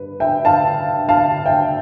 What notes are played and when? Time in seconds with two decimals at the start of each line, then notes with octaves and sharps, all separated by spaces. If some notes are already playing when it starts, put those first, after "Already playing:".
Already playing: G2 B4
0.20 E5 G5
0.45 F5 A5
1.09 F5 A5
1.46 E5 G5